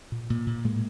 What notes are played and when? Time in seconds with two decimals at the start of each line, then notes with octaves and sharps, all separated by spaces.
0.12 A#2
0.30 A#2
0.47 A#2
0.64 A2 G#3 A#3